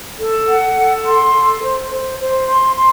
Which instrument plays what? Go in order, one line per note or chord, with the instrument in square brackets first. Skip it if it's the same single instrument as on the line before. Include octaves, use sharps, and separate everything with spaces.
[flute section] A4
F#5
A4
C6
A4
C5
C5
C5
C6
C6